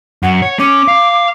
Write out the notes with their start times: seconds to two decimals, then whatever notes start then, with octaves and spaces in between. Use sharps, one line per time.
0.23 F#2 F#5
0.42 C#5
0.59 C#4 D6
0.88 F5